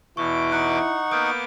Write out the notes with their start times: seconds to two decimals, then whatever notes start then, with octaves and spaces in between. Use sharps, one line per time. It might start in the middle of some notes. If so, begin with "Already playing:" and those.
0.17 E2 B2 E4 C#6 D6
0.52 D#4 F#5 C#6 F#6
1.11 A#3 B3 D6 D#6 F6 G6